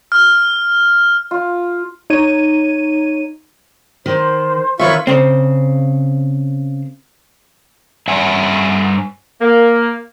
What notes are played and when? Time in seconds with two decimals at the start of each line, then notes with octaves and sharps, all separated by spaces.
0.12 F6
1.31 F4
2.10 D#4 C#5 D#7
4.06 D#3 C5
4.79 D#3 F4 B4 C#5 E5 C#6
5.07 C#3 C4
8.08 G2 E5 F#5 G#5
9.41 A#3